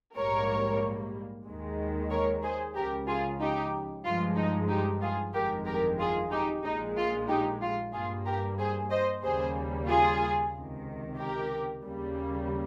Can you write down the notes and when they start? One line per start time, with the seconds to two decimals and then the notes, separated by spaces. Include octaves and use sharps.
0.16 A#1 G#2 G3 A#3 A#4 C#5
1.45 D#2 D#3 G#3
2.10 A#4 C#5
2.43 G#4 C5
2.75 C#2 C#3 F3 G4 A#4
3.08 F4 G#4
3.41 D#4 G4
4.04 G2 F3 G#3 F4
4.37 D#4
4.69 D#4 G4
5.02 F4 G#4
5.34 G1 F2 D#3 G#3 G4 A#4
5.66 G4 A#4
5.99 F4 G#4
6.32 D#4 G4
6.64 A#1 A#2 G#3 D#4
6.97 F4
7.28 D#4 G4
7.62 F4
7.93 G2 G3 A#3 F4 G#4
8.26 G4 A#4
8.58 G#4 C5
8.90 C5 D#5
9.23 D#2 C#3 G3 A#3 G#4 C5
9.88 F4 G#4
10.53 C#2 C3 D#3
11.18 G4 A#4
11.83 D#2 C#3 G3 A#3